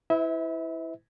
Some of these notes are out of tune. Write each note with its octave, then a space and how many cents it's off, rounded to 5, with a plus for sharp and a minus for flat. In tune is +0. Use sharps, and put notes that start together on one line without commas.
E4 -5 B4 +40 E5 -30